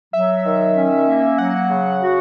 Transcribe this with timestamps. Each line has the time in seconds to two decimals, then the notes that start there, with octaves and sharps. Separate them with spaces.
0.13 F#3 E5
0.44 D#3
0.76 C#4
1.06 A#3
1.38 F#3 F#5
1.70 C#3
2.01 F#4